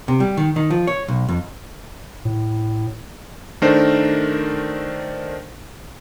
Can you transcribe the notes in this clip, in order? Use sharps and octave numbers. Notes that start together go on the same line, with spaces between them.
C3
G3
D#3
D#3
F3
C#5
B1
F2
A2
D#3 A3 D4 A#4 C5